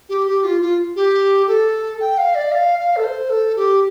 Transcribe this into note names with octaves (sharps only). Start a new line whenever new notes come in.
G4
G4
F4
F4
G4
A4
G5
F5
D5
F5
F5
A4
C5
A4
G4